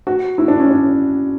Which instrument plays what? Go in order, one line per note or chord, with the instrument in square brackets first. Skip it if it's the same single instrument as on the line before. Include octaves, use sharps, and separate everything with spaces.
[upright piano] F#4
E4
D4
C#4
D4